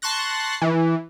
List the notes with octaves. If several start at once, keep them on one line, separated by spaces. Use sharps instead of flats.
A5 C6 C#6 F#6 A#6
E3